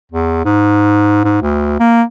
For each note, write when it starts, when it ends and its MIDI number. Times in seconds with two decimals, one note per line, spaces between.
0.12 0.43 40
0.45 1.19 44
1.24 1.41 44
1.42 1.78 38
1.79 2.02 58